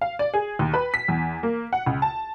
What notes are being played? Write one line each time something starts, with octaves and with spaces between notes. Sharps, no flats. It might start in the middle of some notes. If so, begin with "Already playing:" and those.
F5
D5
G#4
D#2
B4
B6
E2
A#3
F#5
C#2
A5